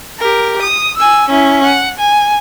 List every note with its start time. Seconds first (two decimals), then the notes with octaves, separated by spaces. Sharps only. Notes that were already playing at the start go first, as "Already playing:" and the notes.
0.19 G4 A#4
0.62 D#6
0.97 G#5 E6
1.30 C#4 E4
1.64 F#5
1.99 G#5